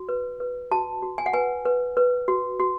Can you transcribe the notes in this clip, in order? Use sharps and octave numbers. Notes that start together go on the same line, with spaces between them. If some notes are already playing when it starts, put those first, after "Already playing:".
Already playing: F#4
B4
B4
F#4 A5
F#4
G#5
F#5
B4 G#5
B4
B4
F#4
F#4